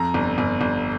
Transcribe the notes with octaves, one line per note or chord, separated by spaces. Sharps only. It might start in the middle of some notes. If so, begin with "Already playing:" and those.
Already playing: F2 A#5
G1
G1
G1